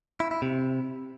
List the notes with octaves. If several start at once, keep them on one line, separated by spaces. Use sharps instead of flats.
E4
E4
C3